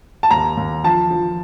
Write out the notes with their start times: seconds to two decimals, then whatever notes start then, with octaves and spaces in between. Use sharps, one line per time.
0.23 A5
0.31 D#2 A#5
0.57 D#2
0.84 F3 A5
1.11 F3